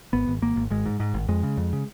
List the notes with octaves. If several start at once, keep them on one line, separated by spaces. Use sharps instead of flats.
G#1 B3
G#1
G#1 A#3
G#1
G#1 G#3
G#2
G#2
G#1
F2 G#3
C#3
F2
C#3